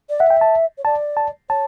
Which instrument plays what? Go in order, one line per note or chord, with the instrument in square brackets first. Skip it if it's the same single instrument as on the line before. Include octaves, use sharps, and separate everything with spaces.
[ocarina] D5
[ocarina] E5 [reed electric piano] F#5
[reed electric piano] G5
A5
[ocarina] C#5
[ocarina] D5 [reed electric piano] A5
[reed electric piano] A5
[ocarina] C#5 [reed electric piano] A5